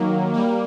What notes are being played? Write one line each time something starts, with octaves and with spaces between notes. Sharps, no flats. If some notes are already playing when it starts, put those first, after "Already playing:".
Already playing: D#3 F#3 A#3
G3 A#3